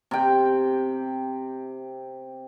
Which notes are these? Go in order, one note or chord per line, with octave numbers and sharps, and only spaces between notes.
C3 G5